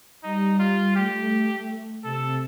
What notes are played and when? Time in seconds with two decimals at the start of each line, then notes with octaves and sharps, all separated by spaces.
0.23 G3 D#4
0.59 F4
0.96 A3 G4
2.03 C3 A4